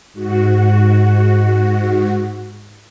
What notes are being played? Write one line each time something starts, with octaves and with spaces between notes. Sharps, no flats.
G#2 F#4